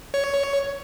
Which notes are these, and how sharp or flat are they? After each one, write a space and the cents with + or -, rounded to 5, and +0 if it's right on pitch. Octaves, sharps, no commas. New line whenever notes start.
C#5 +10